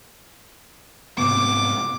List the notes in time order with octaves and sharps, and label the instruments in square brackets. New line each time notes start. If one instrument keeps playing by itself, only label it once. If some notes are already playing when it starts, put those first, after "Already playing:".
[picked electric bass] G#2 C3 B3 [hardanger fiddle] D6